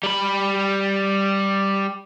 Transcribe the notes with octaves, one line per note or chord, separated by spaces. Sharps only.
G3 B5